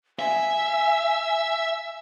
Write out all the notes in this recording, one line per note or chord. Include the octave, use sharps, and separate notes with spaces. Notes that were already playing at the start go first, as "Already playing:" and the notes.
E5 G#5